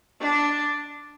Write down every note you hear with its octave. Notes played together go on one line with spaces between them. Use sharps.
D4